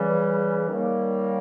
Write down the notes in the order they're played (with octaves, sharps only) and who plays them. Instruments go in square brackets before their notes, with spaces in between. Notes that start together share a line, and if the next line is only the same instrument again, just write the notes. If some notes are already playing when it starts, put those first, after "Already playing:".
Already playing: [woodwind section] C#3 E3 G3
D#3 G3 A#3 C#4